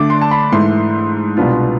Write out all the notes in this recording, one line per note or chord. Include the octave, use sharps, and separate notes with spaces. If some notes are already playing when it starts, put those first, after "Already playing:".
Already playing: D3 A3 D4 D6
C6
A5
B5
G#2 E3 A3 C6
C2 B2 B3 D4 F4